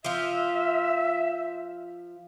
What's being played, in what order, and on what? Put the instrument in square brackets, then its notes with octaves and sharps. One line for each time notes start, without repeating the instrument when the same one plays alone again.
[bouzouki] F3 F4 [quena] E5